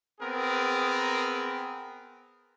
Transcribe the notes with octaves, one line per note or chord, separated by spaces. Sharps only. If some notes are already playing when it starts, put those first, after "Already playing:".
B3 C4 G#4 A#4